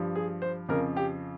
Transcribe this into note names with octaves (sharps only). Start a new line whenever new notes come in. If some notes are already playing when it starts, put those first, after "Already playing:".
Already playing: G2 F3
G#4
C5
F2 C#3 F3 A#4
G4